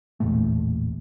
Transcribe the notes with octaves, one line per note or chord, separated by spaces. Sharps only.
E1 A1 A#2 A3